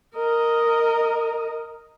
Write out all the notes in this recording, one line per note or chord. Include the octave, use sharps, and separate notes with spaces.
A#4 D#5